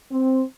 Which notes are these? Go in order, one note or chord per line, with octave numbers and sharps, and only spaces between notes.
C4